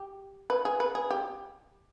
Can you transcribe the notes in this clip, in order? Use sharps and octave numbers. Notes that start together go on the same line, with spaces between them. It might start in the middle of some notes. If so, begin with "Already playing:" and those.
Already playing: G4
B4
G#4
B4
G#4
G4